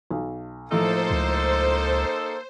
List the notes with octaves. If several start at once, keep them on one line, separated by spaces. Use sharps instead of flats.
B1
A2 F3 A3 A#3 D#4 A4 C5
C#2